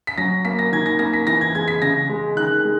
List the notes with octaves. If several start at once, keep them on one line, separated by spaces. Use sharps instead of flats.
B6
F#3 A#6
A#3 B6
A#6
D#3 G#6
A#6
A#3 A#6
B6
E3 A#6
G#6
G#3 G#6
B6
C#3 A#6
G#3
D#3 F#6
G#3